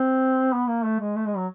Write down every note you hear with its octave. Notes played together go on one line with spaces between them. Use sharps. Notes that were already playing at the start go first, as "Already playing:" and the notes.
Already playing: C4
B3
A#3
A3
G#3
A3
G#3
F#3